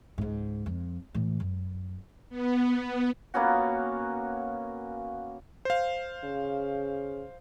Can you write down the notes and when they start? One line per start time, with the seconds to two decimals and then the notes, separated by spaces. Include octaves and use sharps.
0.18 C#2 G#2
0.66 F2
1.14 A2 E3
1.40 F#2
2.30 B3
3.34 A#3 B3 C#4 F#4
5.65 C5 F5
6.24 C#3